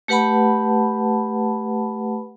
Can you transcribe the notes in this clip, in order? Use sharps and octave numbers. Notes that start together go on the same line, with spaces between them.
A3 G4 B4 F#5 A5 B5